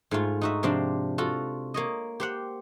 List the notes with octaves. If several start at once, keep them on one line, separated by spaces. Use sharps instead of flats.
G#2 A3 F4
D#4 F#4 E5
C3 F3 C4 D4 F4
F4 F#4 A4
A#3 C#5 D#5
G4 C5 F#5